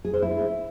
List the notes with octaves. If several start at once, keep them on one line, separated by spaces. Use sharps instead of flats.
G#4
C5
E4